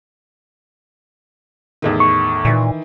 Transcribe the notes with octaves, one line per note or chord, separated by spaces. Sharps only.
E2 A2 D#3
C#6
A#2 D#3 E3